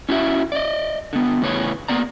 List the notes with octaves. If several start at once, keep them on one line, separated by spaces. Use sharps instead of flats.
C#4 E4 F#4 C#5 E5
D5 D#5
D3 B3
E2 A2 C#3 B4 C#5
A#3 B3 D5 A#5